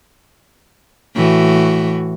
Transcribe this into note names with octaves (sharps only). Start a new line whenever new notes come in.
A2 E3 F#4